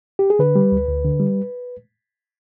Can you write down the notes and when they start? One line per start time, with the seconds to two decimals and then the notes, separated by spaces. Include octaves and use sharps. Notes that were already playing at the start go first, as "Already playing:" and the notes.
0.19 G4
0.30 G#4
0.39 D3 B4
0.55 G3
0.72 D2
0.88 D2
1.05 D3
1.20 G3